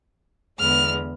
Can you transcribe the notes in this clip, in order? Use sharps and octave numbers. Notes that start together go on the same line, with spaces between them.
E2 D3 G#3 B3 F6